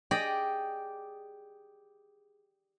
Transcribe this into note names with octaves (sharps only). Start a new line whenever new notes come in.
G4 G#4 D5 D#5